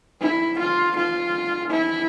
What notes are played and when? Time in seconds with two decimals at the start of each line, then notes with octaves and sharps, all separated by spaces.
0.21 E4
0.59 F4
0.96 F4
1.70 E4